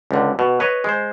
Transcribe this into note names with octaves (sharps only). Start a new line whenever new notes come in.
C#2 D3
B2
B4 C#5 D#5
G#3 C5